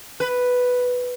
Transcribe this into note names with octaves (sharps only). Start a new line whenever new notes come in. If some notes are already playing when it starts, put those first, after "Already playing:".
B4